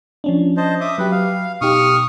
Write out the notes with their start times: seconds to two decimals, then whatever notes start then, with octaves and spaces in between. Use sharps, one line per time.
0.24 F3 C#4 D4
0.57 C5 D#5 A5
0.81 E5 D6 D#6
0.98 F#3 G4 B4
1.11 F5
1.61 B2 D#4 G4 C#6 D#6 F6